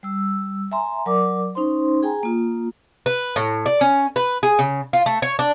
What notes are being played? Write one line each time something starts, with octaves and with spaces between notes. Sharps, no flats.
G3 E6
E5 G#5 A#5 C6
F#3 A#4 D5 D6
C#4 D#4 C5 C6
G#4 G5 G#5 A#5
A#3 F4
B4
A2
D5
C#4
B4
G#4
C#3
F4
A3
C#5
D4